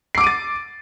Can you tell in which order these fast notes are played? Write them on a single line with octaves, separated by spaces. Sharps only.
C7 D6 D7 D#7 A6